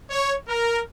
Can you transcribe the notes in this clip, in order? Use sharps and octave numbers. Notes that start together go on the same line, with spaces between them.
C#5
A#4